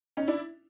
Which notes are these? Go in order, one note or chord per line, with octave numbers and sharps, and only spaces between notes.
C#4 D#4
D4 E4